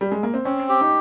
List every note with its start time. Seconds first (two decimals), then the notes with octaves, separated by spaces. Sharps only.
0.01 G3
0.12 G#3
0.23 A#3
0.34 C4
0.45 C4 C#4
0.69 G4
0.81 D#4